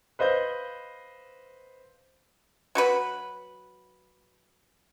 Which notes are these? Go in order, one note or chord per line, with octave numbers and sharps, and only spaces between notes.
B4 C5 D#5 F5 G6
F#3 F#4 B4